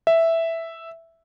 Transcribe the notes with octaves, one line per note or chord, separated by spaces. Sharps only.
E5